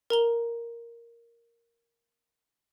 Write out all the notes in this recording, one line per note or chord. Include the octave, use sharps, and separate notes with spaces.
A#4 A#5 G7